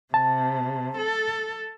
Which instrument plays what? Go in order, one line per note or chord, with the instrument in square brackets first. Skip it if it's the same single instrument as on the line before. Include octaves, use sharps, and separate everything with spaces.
[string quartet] C3 [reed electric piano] A5
[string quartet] A4